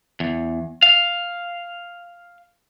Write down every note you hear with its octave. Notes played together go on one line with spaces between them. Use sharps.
E2
F5